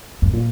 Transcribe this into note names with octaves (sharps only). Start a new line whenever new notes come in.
F#2
A#2